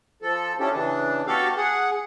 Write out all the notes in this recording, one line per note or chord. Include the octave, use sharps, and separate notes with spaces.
F3 A4
C#4 D4 E4 G4 A4
C#3 E3 D4
B3 F#4 G4 A4 F5
G#4 F#5